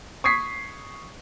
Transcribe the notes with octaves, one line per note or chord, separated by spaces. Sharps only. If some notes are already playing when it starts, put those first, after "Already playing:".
C#6 D#6 G#6 B6 C7